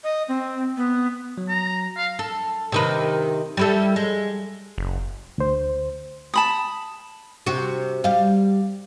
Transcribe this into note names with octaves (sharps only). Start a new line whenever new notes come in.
D#5
C4
B3
F#3
A#5
F5
A4
C3 D#3 B4
G3 E4 A4
G#3
F#1
D2 C5
A5 B5 D#6
C3 F#4
G3 F5